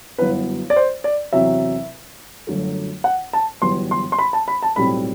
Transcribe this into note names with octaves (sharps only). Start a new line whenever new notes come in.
G1 F#2 F#3 B3 E4 B4
D5
C5
D5
E2 C3 F#3 C4 E4 E5
G1 F#2 D3 F#3 A3
F#5
A5
G1 F#2 E3 G3 B3 C6
C6
C6
B5
A5
B5
A5
B1 A2 G3 C4 B5